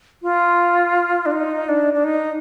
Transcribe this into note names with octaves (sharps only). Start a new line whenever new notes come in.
F4
D4
D#4
D4
D4
D#4